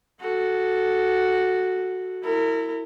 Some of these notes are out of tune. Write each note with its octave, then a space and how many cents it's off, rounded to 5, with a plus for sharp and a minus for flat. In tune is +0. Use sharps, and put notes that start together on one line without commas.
F#4 +0 A4 -5
E4 +0 A#4 -35